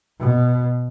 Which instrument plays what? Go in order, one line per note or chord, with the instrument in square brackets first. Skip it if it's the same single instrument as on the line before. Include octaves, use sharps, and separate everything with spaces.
[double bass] B2